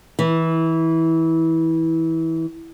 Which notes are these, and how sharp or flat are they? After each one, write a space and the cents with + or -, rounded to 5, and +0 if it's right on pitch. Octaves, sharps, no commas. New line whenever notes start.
E3 -20